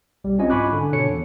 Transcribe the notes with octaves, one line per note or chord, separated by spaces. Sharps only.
B1 G3
C4 C#4 E4 F4 D#5 G#5
G#2 G#5 B5 C#6 D6 F#6
D3
B2 D3 D#3 A4 C#5 C#7
E2